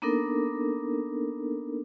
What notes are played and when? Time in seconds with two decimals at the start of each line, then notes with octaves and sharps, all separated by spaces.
0.02 A#3 B3 D4 D#4 A4 A#4